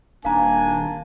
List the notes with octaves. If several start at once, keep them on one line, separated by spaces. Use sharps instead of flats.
D#1 A#3 D4 F5 G#5 A#5